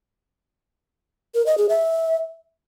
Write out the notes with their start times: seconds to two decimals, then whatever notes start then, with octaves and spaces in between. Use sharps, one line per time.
1.35 A#4
1.46 D#5
1.58 G#4
1.69 E5